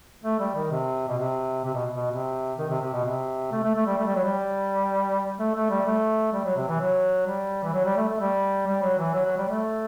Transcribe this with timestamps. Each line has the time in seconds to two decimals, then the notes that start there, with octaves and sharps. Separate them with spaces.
0.24 A3
0.40 G3
0.55 D#3
0.71 C3
1.08 B2
1.18 C3
1.64 C3
1.74 B2
1.94 B2
2.11 C3
2.59 D#3
2.70 C3
2.82 C3
2.93 B2
3.05 C3
3.52 A3
3.64 A3
3.75 A3
3.87 G3
3.98 A3
4.07 G3
4.16 F#3
4.24 G3
5.39 A3
5.55 A3
5.70 G3
5.86 A3
6.33 G3
6.44 F#3
6.57 C3
6.68 E3
6.80 F#3
7.27 G3
7.64 E3
7.74 F#3
7.85 G3
7.97 A3
8.08 A3
8.20 G3
8.67 G3
8.82 F#3
8.98 E3
9.14 F#3
9.25 F#3
9.38 G3
9.49 A3